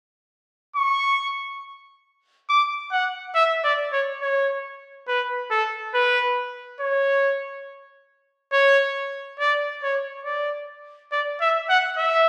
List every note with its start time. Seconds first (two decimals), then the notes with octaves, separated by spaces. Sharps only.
0.76 C#6
2.49 D6
2.92 F#5
3.35 E5
3.64 D5
3.92 C#5
4.22 C#5
5.08 B4
5.51 A4
5.94 B4
6.81 C#5
8.52 C#5
9.40 D5
9.83 C#5
10.25 D5
11.12 D5
11.41 E5
11.70 F#5
11.98 E5